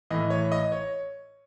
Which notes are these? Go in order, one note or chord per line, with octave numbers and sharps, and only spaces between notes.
A2 E3 D#5
C#5
D#5
C#5